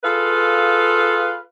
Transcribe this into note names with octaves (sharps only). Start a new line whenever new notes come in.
F4 G#4 A4 B4 F5